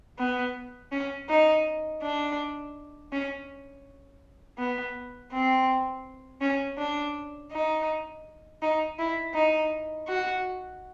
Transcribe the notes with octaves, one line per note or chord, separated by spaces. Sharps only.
B3
C#4
D#4
D4
C#4
B3
C4
C#4
D4
D#4
D#4
E4
D#4
F#4